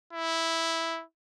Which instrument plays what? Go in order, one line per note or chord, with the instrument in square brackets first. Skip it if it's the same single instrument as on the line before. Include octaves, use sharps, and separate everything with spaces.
[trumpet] E4